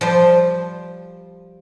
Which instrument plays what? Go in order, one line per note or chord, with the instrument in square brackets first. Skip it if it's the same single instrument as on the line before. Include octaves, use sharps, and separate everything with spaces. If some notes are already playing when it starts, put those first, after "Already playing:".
[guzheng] F3 G3 C5